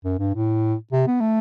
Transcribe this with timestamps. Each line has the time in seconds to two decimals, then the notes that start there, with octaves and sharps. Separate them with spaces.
0.05 F#2
0.19 G2
0.34 A2
0.92 C3
1.07 B3
1.21 A3